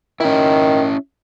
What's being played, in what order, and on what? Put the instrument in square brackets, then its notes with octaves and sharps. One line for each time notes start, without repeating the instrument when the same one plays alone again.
[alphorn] D#3 [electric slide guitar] C#4 E4